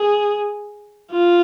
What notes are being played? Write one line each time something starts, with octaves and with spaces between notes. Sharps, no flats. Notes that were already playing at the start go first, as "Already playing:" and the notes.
Already playing: G#4
F4